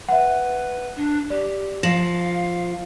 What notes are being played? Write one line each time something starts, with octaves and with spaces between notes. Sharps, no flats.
B4 E5 F#5
D4
G4 D5
F3 F5 A#6 E7 F#7